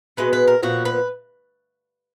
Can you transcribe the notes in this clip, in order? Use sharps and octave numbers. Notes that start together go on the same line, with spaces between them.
B2 G#3 B3 B4
B4
A#4
A#2 F3 B3 F#4
B4